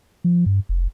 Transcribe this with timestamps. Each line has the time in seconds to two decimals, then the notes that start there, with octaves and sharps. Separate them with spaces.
0.24 F3
0.46 G2
0.69 F1